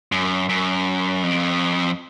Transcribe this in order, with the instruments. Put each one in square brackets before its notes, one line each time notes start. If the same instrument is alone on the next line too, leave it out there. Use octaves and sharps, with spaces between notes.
[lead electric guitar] F#2
F#2
F2